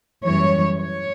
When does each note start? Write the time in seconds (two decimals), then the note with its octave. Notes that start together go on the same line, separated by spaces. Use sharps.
0.23 F#2 E3 G3 C#5
0.78 C#5